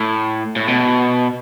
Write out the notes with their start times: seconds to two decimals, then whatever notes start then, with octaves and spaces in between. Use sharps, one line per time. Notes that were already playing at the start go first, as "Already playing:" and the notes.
Already playing: A2
0.56 A2
0.68 B2